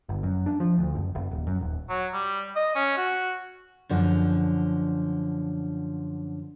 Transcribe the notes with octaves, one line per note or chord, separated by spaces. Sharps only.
G1
F#2
D4
F3
D2
F#1
F#1
D#1
F#2
D#1
F#3
G3
D#5
C#4
F#4
F#2 D3 F3